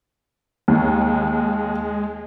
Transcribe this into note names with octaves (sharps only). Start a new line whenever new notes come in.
D#2 G#3